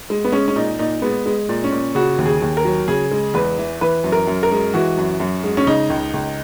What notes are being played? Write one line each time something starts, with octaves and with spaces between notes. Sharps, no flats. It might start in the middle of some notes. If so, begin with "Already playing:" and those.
G#3
B3
G#3 C#4
C#4
A#2 D#4
A#2 D#4
G#3 B3
G#3
A#2
C#4
A#2
C#3 F#4
D#2
G#4
D#2
A#4
F#3
C#3 G#4
G#3
E2 B4
E3
E3 B4
F#2
A#4
F#2
A#4
G#3
E3 F#4
F#2
F#2
G#3
C#4
C#3 D#4
C#2
C#2